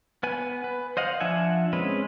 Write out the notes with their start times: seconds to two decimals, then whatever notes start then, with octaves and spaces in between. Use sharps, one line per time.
0.23 B3 B4 G#5
0.64 B4
0.97 C5 D#5 F5 F#5
1.20 F3 D4 E5 F#5 G#5
1.73 G#3 C4 C#4 B4